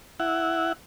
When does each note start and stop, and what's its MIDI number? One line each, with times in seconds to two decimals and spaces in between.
0.20 0.72 64
0.20 0.72 78